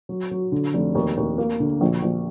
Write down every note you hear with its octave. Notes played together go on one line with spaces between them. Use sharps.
F#3
F#3
D3
F1
D#2
D#2
A#3
D3
A#1
A#1